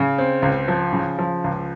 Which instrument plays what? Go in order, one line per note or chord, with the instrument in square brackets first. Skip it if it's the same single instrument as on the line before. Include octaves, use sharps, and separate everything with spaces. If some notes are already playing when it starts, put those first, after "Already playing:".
Already playing: [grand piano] C#3
C4
C#2
F3
C#3
F3
C#2